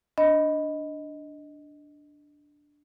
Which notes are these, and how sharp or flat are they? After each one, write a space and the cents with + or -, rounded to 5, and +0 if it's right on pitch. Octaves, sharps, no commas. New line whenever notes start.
D4 +0 D#5 +5 B5 +0